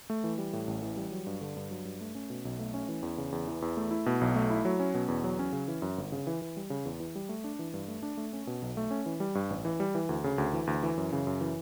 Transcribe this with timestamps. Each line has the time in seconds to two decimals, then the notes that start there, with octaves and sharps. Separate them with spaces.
0.10 A3
0.24 E3
0.38 G3
0.53 A2
0.67 A1
0.82 E3
0.97 G3
1.12 F#3
1.27 G2
1.41 D3
1.57 G2
1.71 F#3
1.85 G2
2.01 A3
2.15 C#4
2.30 B2
2.45 B1
2.59 A3
2.74 C#4
2.88 E3
3.03 E2
3.18 C#3
3.32 E2
3.48 E3
3.62 E2
3.77 A3
3.91 E4
4.06 B2
4.21 B1
4.35 A3
4.50 E4
4.65 F#3
4.80 C#4
4.94 B2
5.08 E2
5.24 F#3
5.39 C#4
5.53 C#3
5.68 E3
5.82 F#2
5.98 G1
6.12 C#3
6.27 E3
6.42 E3
6.57 G3
6.70 C#3
6.85 E2
7.00 E3
7.15 G3
7.29 A3
7.44 D4
7.59 E3
7.74 G2
7.88 A3
8.03 D4
8.17 A3
8.33 C#4
8.47 B2
8.62 B1
8.77 A3
8.91 C#4
9.06 E3
9.20 G3
9.35 G2
9.50 A1
9.65 E3
9.80 G3
9.95 E3
10.09 D2
10.24 C#3
10.38 D2
10.53 E3
10.67 D2
10.83 E3
10.97 F#2
11.12 C#3
11.27 F#2
11.41 E3